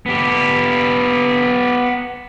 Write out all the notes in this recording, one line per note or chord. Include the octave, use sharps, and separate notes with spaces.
B3 G4